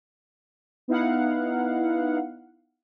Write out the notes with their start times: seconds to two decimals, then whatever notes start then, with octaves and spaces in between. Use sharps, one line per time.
0.88 B3 D#4 E4 F5 F#5